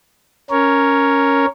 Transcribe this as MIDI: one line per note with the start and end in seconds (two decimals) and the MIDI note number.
0.51 1.46 61
0.51 1.46 70
0.51 1.46 73